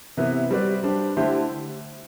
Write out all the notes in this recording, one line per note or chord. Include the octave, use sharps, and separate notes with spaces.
C3 E3 B3 E4 B4
G3 C4 F#4 B4 D5
G3 D4 G4 C5
D3 A3 E4 G4 C5